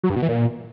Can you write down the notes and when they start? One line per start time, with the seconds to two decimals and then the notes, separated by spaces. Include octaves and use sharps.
0.03 F#3
0.10 G2
0.16 B2
0.22 E3
0.29 A#2